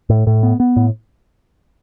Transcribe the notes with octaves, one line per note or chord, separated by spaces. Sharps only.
A2
A2
B3
B3
A2